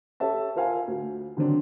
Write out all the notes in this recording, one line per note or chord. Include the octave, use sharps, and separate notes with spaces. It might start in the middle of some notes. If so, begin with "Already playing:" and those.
G4 A4 C#5 E5 A5
F4 A#4 C5 F5 G#5
D2
D3 D#3 F#3 C4 D4